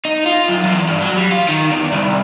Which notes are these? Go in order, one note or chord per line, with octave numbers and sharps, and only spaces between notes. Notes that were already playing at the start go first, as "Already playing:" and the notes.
D#4
F4
F#2
E2
G2
F#3
G3
F4
D#3
E2
C2